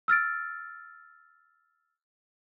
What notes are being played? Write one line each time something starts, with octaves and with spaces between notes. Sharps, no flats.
E6 F6 A6 D7